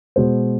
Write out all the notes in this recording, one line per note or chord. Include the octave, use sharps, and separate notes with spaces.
B2 G#3 C5